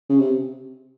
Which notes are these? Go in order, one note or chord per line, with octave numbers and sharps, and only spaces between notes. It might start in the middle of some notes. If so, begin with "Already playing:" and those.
C#3
C3